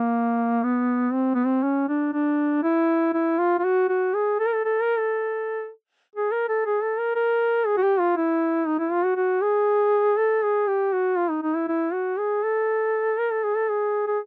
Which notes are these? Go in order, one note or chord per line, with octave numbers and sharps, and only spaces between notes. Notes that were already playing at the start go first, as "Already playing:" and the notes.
Already playing: A#3
B3
C4
B3
C4
C#4
D4
D4
E4
E4
F4
F4
F#4
F#4
G#4
A4
A#4
A4
A4
A#4
A4
G#4
A#4
A4
G#4
A4
A#4
A#4
G#4
F#4
G4
F4
E4
D#4
E4
F4
F#4
F#4
G#4
A4
G#4
G4
F#4
F4
D#4
D#4
E4
E4
F#4
G#4
A4
A#4
A4
G#4
A4
G#4
G#4